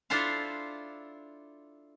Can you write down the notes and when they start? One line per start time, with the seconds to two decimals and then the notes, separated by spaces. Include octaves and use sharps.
0.10 D4 E4 F4 A4 C5 F5